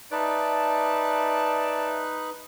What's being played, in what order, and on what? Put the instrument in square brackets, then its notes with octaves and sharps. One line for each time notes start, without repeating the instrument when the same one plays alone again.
[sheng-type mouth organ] D#4 B4 F#6 [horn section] D5 E5 A5